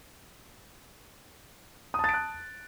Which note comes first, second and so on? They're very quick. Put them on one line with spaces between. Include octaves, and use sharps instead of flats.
D#6 A5 A6 D7 F#6